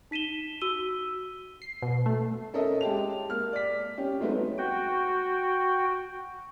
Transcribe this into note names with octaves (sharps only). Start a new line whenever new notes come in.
D#4 B6 D#7 E7 G7
F#4 E6 D#7 G7
C7
B2
A3
C#4 A4 A#4 D#5 E5
G#3 G4 A5 F7
A#3 F6
D5 B6
C#4 G4
F#3 G#3 A3 B3 C4 D#4
F#4 G5